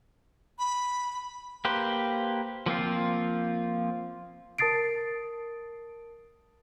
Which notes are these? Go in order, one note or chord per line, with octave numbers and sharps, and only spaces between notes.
B5
A#3 G4 B4 C5
F3 A#3 C4 F4
A#4 A5 D#6 A6 C7 D7